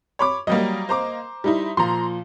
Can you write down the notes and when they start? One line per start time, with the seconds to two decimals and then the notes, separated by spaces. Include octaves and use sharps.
0.19 C#5 B5 D6
0.47 F#3 G3 A#3 D#5
0.89 C5 A#5 D6
1.44 G3 D#4 E4
1.77 A#2 F3 A#5 C6